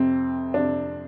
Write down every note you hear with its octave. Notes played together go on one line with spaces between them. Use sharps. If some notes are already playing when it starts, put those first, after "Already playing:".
Already playing: F2 C3 C4
F2 C3 D4